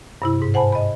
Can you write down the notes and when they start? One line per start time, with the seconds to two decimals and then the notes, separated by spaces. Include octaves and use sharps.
0.22 G2 C3 E4
0.42 G#2
0.54 C5 F#5 G#5 A5 B5
0.72 D#5 B5